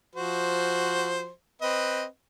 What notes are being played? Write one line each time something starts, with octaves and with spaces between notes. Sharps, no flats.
F3 F#4 C5
C4 B4 D#5